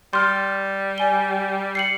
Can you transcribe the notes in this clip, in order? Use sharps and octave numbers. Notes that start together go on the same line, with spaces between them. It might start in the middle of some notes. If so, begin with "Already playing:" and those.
G3 C6 F6
D5 G#5 G7
C7 C#7 F#7